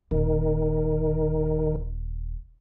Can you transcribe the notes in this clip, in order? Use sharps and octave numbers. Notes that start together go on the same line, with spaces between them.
D#1 D#3